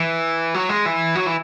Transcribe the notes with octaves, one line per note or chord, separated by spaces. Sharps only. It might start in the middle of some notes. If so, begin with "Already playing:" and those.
Already playing: E3
F#3
G#3
E3
F#3
E3